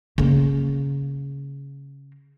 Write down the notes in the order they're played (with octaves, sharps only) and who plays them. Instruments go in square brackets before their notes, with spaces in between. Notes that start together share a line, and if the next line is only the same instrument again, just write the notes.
[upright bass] C#3 A#3